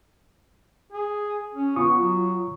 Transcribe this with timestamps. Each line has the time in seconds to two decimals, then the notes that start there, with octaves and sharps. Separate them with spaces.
0.92 G#4
1.54 C#4
1.76 B3 F4 C#6 D#6
1.94 F#3